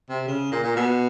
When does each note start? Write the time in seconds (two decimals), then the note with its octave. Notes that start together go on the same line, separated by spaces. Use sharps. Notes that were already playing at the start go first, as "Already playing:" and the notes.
0.10 C3
0.28 C#3
0.52 A#2
0.64 A#2
0.76 B2